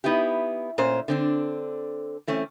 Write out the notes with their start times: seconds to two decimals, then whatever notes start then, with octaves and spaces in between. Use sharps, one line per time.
0.04 B3 D#4 E4 G4
0.78 A#2 A3 C#4 C5
1.08 D3 C4 D4
2.27 E3 A3 C4 C#4